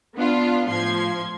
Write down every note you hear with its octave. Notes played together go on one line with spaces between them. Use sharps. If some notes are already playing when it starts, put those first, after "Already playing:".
B3 D4 F4
A2 F3 C6 G#6